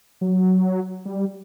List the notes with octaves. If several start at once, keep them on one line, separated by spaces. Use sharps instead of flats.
F#3
G3